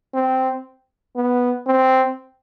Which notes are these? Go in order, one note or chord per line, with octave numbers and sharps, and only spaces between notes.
C4
B3
C4